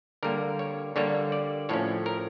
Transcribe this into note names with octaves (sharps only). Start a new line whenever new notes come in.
D3 G3 A#3 A#4
C#5
D3 G3 A#3 C#5
D5
A2 F3 C#4 C#5
A#4